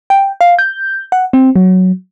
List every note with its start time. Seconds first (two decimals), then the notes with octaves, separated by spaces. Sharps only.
0.10 G5
0.41 F5
0.59 G6
1.12 F#5
1.33 C4
1.56 F#3